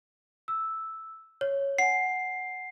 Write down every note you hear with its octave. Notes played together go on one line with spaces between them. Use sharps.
E6
C#5
F#5 G#5 C7